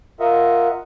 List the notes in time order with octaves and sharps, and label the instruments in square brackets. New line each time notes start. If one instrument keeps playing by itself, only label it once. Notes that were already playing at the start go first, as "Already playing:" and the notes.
[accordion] F4 A#4 D#5 E5 F#5